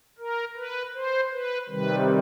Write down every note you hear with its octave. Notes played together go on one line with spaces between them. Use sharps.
A#4
B4
C5
B4
C3 D#3 G3 B4